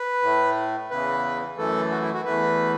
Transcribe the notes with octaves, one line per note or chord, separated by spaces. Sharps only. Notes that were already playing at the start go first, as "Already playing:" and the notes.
Already playing: B4
A2 A3
E2 C#3 E3 B4
F#2 E3 A3 A4
F#4
E4
F#4
E2 E3 A3 B4